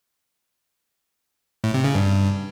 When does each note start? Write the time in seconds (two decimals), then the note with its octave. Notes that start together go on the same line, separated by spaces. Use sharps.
1.64 A2
1.74 C3
1.84 C#3
1.95 G2